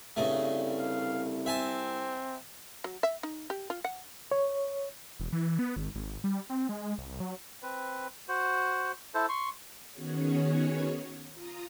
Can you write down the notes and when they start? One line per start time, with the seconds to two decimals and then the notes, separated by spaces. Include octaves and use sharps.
0.16 C2 G2 C#3 A3
0.78 F5
1.46 C4 E5 G#5 A5
2.84 F#3
3.03 E5
3.23 D#4
3.50 G4
3.70 F4
3.84 F#5
4.31 C#5
5.20 E1
5.33 E3
5.59 B3
5.76 G#1
5.95 G#1
6.24 G3
6.50 C4
6.69 G#3
6.98 C2
7.20 F#3
7.62 C4 B4
8.28 F#4 C5
9.14 E4 A4 C5
9.29 C6 C#6
9.92 D#3 B3 C#4 F#4 G#4 C#5
11.33 F4 A#5 D#6